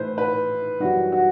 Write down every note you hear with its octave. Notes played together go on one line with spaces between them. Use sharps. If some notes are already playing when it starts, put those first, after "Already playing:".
Already playing: A2 E3 A3 B4 C5
B4
F#2 E3 G3 F#4
F#4